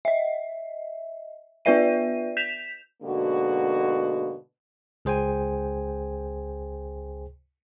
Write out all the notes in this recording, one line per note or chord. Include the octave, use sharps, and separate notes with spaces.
D#5 E5
B3 F4 B4 D5 E5 D#7
G6 B6 E7 F7
G#2 B2 D3 A#3 F#4
C#2 G#4 C5 G5 G#5